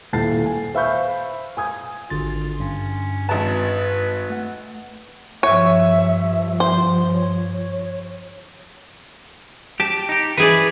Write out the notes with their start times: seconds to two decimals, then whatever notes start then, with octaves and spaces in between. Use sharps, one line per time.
0.13 D#1 E4 A5 A6 C7
0.46 G#5
0.75 C5 E5 F5 B5 C#6 G6
1.57 G#5 D#6 G#6
2.10 G#1 D3 F4 A6
2.60 G2 C#4
3.29 G#1 B4 A5
4.30 A3 F#5
5.43 G2 F3 C#5 E5
6.60 C5
7.13 C#5
9.80 G4 A5
10.09 D#4 G4
10.37 E3 G#4 B4 D5